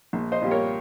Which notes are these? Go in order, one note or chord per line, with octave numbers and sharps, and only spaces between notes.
A#1
C5 D#5
A#2 G3
A#4 C#5